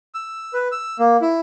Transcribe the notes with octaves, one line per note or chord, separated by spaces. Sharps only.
E6
B4
E6
A#3
E4